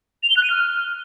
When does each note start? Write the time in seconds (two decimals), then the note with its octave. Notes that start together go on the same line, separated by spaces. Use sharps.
0.23 F7
0.30 G7
0.37 F#6
0.43 D#7
0.50 F6